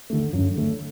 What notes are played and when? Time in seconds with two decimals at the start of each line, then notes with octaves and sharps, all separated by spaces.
0.10 D3 A3
0.33 F#2
0.56 D3 A3